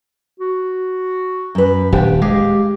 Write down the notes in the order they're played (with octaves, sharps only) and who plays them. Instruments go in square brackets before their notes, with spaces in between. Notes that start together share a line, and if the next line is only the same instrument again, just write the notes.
[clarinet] F#4
[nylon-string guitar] F#2 B4
[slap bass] D#1 [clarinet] D4 [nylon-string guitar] G4
[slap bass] G#3 [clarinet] G4 [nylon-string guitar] F5